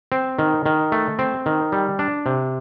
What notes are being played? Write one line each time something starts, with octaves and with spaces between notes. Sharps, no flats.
C4
D#3
D#3
A3
C4
D#3
G3
D4
C3